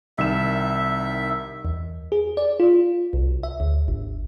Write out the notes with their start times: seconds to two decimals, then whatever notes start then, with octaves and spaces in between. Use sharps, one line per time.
0.18 C2 D#3 E5 E7
1.65 E2
2.12 G#4
2.37 D5
2.60 F4
3.13 C2
3.43 E5
3.60 D2
3.88 G#1